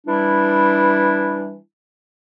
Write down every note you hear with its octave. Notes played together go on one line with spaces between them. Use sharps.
E3 G3 D4 E4